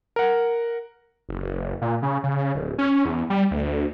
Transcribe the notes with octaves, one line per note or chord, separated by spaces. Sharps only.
A#4 F#5
F#1
A#2
C#3
C#3
D1
C#4
E2
G3
D2